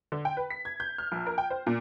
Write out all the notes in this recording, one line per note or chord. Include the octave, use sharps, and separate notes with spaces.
D3
G5
B4
B6
G#6
G6
F6
A#1
A#4
G5
C5
A#2